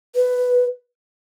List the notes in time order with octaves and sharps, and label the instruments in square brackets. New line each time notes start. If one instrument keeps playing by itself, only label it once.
[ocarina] B4